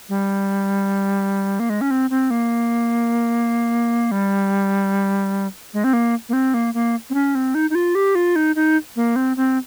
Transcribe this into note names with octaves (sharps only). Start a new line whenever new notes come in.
G3
A#3
G#3
C#4
C4
C4
A#3
G3
G#3
C4
A#3
A#3
C4
A#3
A#3
C4
C#4
C4
D#4
D#4
F4
G4
F4
D#4
D#4
A#3
C4
C4